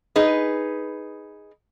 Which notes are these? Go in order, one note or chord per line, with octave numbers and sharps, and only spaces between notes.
D#4 G#4 B4